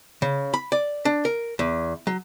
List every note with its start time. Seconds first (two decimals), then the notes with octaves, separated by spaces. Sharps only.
0.22 C#3
0.54 B5
0.72 D5
1.05 D4
1.25 A#4
1.59 E2
2.07 F#3